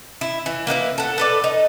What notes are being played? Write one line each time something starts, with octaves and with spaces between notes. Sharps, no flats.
E4
E3
A#3 E4 F#4 B4
A4 F#5
A4 B4 D5
D#4